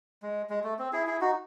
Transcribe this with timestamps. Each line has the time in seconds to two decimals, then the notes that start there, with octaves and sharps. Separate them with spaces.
0.22 G#3
0.50 G#3
0.64 A3
0.79 C4
0.93 E4 G#4
1.07 E4 G#4
1.21 D#4 F#4